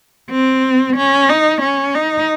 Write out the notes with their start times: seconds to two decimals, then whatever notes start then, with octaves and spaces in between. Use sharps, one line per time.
0.31 C4
0.97 C#4
1.29 D#4
1.62 C#4
1.94 D#4